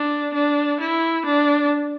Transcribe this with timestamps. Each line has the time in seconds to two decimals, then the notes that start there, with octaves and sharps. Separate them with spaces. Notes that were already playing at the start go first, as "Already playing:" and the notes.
Already playing: D4
0.34 D4
0.80 E4
1.25 D4